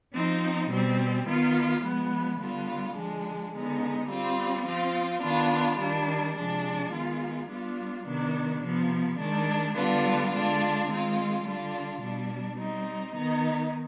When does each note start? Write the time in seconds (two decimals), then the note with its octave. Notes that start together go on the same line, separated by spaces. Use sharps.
0.12 F3 C4 D#4
0.69 B2 G3 C4
1.26 D#3 B3 F4
1.82 F3 G#3 B3
2.39 D3 G3 B3 F4
2.96 D3 F3 G#3 D4
3.53 D3 G#3 B3 D#4
4.08 G3 C4 F4
4.66 F3 C4 F4
5.22 D#3 B3 D4 F4
5.79 D#3 G3 D4
6.35 C3 F3 G#3 D4
6.92 D#3 G#3 B3 F4
7.48 G3 B3 D4 F4
8.06 C3 D#3 B3 D4
8.62 C3 F3 B3
9.18 D#3 G#3 D4
9.75 D3 G3 B3 D4 F4
10.31 D3 G#3 D4 F4
10.88 D#3 G#3 C4 F4
11.44 D3 G3 D4 F4
12.01 B2 G3 D4
12.58 G3 C4 D#4
13.15 D#3 B3 D#4